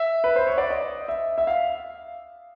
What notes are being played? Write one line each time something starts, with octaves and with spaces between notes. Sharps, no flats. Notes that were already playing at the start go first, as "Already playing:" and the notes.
Already playing: E5
B4
C5
C#5
D5
D#5
E5
E5
F5